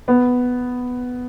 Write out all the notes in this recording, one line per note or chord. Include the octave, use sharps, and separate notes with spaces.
B3